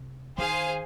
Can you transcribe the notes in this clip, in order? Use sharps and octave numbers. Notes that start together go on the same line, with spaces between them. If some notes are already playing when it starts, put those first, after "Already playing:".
Already playing: C3
D#3 G#4 C5 F5 G#5